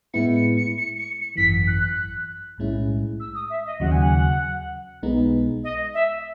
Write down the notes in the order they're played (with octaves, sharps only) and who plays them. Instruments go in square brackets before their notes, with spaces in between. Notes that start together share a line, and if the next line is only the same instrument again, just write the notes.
[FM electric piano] A2 G#3 B3 E4 [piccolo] C#7
[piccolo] C#7
C#7
C#7
C#7
C#7
[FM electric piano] G#1 F#2 E3 [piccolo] B6
[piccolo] F#6
[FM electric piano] B1 A2 G#3 C#4 E4
[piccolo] E6
D#6
E5
D#5
[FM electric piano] D#2 C#3 F#3 [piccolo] F#5
[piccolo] G#5
F#5
[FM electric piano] B1 B2 G#3 B3 D#4
[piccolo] D#5
E5